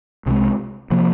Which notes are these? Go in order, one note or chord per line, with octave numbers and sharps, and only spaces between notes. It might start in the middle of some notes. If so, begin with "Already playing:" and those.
C2 C3 D#3
G#3
C3 F3 A#3